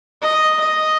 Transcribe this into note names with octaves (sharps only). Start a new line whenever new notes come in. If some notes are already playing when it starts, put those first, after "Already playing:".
D#5
D#5